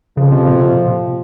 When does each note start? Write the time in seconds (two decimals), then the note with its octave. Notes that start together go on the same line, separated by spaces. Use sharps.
0.17 F2 C#3 F3
0.32 C3
0.47 A#2
0.57 C3
0.66 A#2